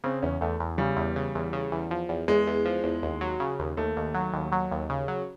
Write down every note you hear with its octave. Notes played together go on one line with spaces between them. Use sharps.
C#3 C4
E2 C#4
E2 A3
E2
C#3 G3
E2
C#3
E2
C#3
E2
F3
E2
E2 G#3
E2
F3
E2
D#2
F#3
C#3
D#2
D#2 A3
D#2
F#3
D#2
F#3
D#2
C#3
F#3